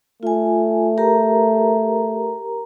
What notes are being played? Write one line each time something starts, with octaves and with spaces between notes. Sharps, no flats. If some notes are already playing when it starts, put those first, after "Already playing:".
A3 F4 G#5
G4 A#4 A#5